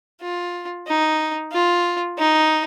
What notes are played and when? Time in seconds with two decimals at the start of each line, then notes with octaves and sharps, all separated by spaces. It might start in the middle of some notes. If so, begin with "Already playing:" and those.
0.21 F4
0.87 D#4
1.52 F4
2.18 D#4